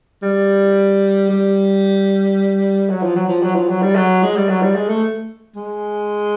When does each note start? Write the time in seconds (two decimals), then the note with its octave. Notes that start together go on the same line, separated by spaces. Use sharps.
0.22 G3
1.29 G3
2.89 F#3
3.02 F3
3.16 F#3
3.29 F3
3.42 F#3
3.55 F3
3.69 F#3
3.82 G3
3.96 F#3
4.23 G#3
4.36 G3
4.49 F#3
4.62 G3
4.76 G#3
4.89 A3
5.56 G#3